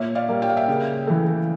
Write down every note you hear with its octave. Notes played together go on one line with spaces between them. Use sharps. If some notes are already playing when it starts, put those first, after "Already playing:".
Already playing: A#2 C#5 E5
D5 F5
G3 A#3
G5
F5
E5 G5
C#3
E3 A3